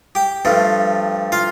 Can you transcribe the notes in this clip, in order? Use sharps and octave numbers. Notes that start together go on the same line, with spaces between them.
G4 G5
G2 F3 A3
F4 F5